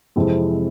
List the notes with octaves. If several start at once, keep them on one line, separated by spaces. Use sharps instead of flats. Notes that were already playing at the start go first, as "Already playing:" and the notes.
F2 C3 E3 G#3 C4